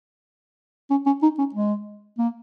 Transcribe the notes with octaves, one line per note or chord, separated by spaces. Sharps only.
C#4
C#4
D#4
C#4
G#3
A#3